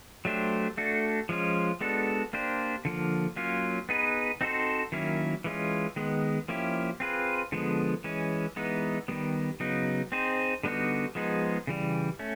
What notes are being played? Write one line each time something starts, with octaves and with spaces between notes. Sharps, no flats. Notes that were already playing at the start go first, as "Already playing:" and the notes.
F#3 A3 D4 G4 C5
A3 D4 F#4 A4
F3 G#3 C#4 F4
G#3 B3 D4 F#4 A4
A#3 D4 G4 C5
D3 F3 A#3
F#3 A#3 C#4 F4
B3 D#4 G#4 B4
C4 D#4 F#4 A4 C5
D#3 F#3 A#3 C#4 E4
E3 G#3 C#4 F4
D#3 G#3 B3
F3 A#3 C#4 E4 G4
C4 F4 G#4 B4
D3 F3 G#3 B3
E3 G#3 C#4
E3 G#3 B3 D#4
D#3 G3 B3
C#3 F#3 B3 D#4
C4 D#4 G#4 C5
D3 G3 B3 D#4 F#4
F3 G#3 B3 D#4 G#4
C#3 E3 G3
A3 C#4